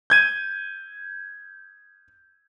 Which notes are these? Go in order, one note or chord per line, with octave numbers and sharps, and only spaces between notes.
G6 G#6 D#7